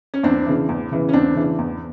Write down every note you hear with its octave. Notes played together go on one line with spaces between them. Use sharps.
C#4
E2 C4 D4
C#3 E3
E2
C#3 E3
C#4
E2 C4 D4
C#3 E3
E2